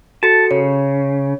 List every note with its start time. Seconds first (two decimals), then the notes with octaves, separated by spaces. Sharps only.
0.23 F#4 A4 A5 C#7
0.51 C#3 C#5